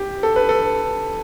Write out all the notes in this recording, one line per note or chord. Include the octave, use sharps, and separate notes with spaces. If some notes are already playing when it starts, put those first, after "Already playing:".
Already playing: G4
A4
B4
A4